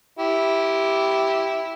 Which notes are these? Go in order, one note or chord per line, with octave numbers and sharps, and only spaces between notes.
E4 G4